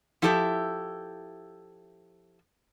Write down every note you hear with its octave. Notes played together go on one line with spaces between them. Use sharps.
F3 E4 G4 A4 D5 E5